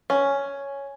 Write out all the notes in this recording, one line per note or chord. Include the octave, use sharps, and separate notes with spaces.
C#4